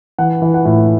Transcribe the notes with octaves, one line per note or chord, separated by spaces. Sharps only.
E3 F#5
E3
F#5
A2